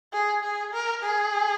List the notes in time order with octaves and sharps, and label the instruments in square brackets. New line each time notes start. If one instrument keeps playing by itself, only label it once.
[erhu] G#4
G#4
A#4
G#4